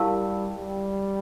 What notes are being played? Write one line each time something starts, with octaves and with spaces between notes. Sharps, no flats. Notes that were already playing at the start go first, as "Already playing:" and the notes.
Already playing: G3 E4 G4 A#4 F5 A5
G3